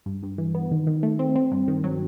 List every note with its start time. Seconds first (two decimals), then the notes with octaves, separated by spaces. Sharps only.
0.06 G2
0.23 G2
0.38 E3
0.55 B3
0.71 D#3
0.87 D#3
1.03 A3
1.19 C4
1.35 C4
1.52 G2
1.68 D#3
1.84 F#3